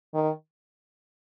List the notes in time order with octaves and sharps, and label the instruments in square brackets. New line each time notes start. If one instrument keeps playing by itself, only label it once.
[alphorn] D#3